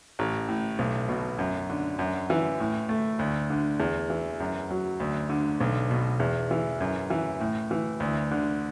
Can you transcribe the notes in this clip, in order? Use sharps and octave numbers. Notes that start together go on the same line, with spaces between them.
A1
A2
B1
B2
F#2
D3
F#2
E3
A2
A3
D2
D3
E2
E3
F#2
F#3
D2
D3
B1
B2
E2
E3
F#2
E3
A2
E3
D2
D3